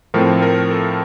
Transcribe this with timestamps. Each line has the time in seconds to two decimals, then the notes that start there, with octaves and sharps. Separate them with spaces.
0.14 A2 F3 A3 C4 A#4
0.42 A#4
0.71 A4